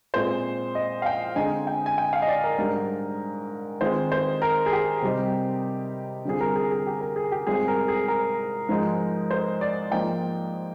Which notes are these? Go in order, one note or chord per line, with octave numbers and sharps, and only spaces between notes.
A#2 G#3 C4 F4 C5
D#5
F5
G5
D3 G#3 C4 D#4 G#5
G5
G#5
G5
F5
D#5
D5
A#4
G#2 G3 D4 A#4
D#3 G#3 C4 F4 C5
C5
A#4
G#4
G4
C3 G3 C4 D#4
D3 G3 C4 F4 G#4
A#4
G#4
G#4
G4
A#4
G#4
G4
G#2 G3 C4 F4 G#4
A#4
G#4
A#4
G#2 F3 G#3 D#4
C5
D5
G#2 F3 A#3 D#4 G5